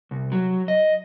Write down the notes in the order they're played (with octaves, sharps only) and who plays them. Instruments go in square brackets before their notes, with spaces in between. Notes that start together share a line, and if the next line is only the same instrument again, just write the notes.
[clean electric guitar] C2
F#3
D#5